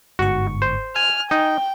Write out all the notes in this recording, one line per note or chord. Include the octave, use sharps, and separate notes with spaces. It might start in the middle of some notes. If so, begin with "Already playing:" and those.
G1 G#2 F#4 C#6
C5
G#5 F6
D#4 G5